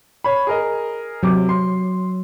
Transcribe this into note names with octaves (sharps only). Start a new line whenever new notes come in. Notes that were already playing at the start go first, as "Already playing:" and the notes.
C#5 B5
G#4 A#4 D#5
C3 F#3 D6
C6